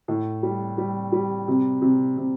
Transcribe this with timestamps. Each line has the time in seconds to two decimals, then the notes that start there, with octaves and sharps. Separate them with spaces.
0.08 A2
0.43 G3
0.78 G3
1.12 G3
1.48 C3
1.82 C3
2.17 C3